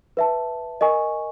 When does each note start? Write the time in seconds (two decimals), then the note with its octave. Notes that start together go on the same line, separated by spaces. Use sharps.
0.17 B4 E5 A5
0.81 A#4 D#5 G#5 C#6